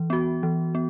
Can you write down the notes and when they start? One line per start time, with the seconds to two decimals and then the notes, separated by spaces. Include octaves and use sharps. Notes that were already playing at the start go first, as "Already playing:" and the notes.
Already playing: E3
0.10 B3 F#4
0.43 E3
0.75 B3